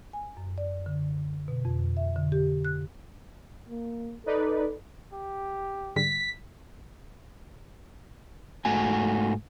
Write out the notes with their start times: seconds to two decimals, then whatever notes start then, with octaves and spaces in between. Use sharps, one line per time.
0.13 G#5
0.37 F#2
0.58 D5
0.86 D3
1.48 B2
1.65 F2
1.97 E5
2.16 D3
2.32 G4
2.65 F#6
3.69 A#3
4.26 D#4 A4 B4 D5
5.13 G4
5.96 G#2 D3 G3 B6
8.65 G#2 A3 F#4 G#5